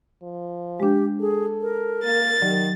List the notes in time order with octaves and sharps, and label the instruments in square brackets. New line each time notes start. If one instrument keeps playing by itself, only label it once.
[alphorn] F3
[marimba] G#3 D4 [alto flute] G4
[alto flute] G#4 [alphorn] A4
[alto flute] A#4
[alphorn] A#3 [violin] A6
[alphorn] D#3 [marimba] F#3 G4 D5